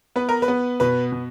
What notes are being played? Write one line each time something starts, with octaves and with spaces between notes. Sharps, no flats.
B3 B4
A#4
B4
B3
B2 B4
B2